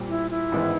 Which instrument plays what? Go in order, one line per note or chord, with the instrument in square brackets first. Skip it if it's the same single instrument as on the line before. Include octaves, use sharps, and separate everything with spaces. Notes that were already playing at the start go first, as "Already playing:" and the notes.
Already playing: [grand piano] A#2 G3 C4
[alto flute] E4
E4
[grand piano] A1 G#2 D#3 G#3 B3